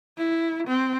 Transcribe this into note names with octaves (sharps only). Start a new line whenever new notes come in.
E4
C4